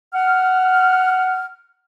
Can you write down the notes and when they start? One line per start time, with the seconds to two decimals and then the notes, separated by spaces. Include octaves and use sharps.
0.14 F#5 F6